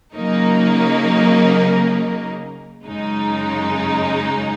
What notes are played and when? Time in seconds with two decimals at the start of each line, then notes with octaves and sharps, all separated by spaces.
0.15 C#3 F#3 A#3 D#4 A#4
2.85 F#2 C#3 G#3 D#4